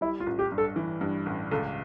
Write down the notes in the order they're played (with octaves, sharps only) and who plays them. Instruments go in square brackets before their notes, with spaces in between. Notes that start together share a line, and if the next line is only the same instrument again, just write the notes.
[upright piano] G3 [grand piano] E4
[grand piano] F4
[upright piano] A1
[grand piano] G4
[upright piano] G2
[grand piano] A4
[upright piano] E3
G2
A1
[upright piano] C#2 [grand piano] A4